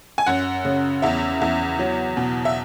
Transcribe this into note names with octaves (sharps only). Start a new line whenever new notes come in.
G#5
F#2 F#5
C#3
E2 E5
E2
F#3
B2
E5